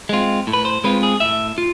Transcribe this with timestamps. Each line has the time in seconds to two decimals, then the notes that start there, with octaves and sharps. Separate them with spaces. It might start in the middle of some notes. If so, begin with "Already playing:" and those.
0.09 G#3 C4 F4
0.47 A2
0.53 B4
0.65 C5
0.84 G#3 C4 F4 B4
1.03 G#4
1.20 A2 E5
1.58 F4